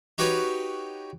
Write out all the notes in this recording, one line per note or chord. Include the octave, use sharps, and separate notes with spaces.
D#4 F#4 G4 B4 C#5 D#5